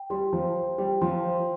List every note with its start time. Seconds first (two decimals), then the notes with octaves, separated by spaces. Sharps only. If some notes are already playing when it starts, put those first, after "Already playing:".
Already playing: G5
0.10 G3 C6
0.33 F3 C5
0.56 C5
0.78 G3 G5
1.01 F3 C6
1.24 C5